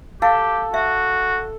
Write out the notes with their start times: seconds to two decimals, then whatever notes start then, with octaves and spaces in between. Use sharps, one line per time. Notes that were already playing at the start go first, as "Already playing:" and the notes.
0.22 G4 A4 F5
0.74 F#4 E5